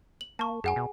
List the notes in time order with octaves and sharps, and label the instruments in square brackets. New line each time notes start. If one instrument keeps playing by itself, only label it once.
[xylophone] F#7
[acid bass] A#3 [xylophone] A5 C#6
[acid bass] F#2 [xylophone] G#4 F#5 G#5
[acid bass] B2